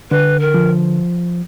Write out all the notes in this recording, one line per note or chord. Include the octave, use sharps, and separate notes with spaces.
D3 B4
A#4
F3